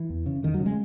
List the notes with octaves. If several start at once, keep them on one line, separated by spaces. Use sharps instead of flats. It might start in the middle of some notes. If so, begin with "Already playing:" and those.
Already playing: E3
E2
C#3
E2 D#3
F#3
C#3
G#3